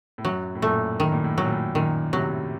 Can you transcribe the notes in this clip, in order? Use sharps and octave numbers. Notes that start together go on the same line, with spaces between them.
A2
F#2 F#3
A2
F#2 A#2 A3
A2 D#3
A#2
A2
A2 F#3
A#2
A2
F#2 A#2 D#3
A2 C3 F#3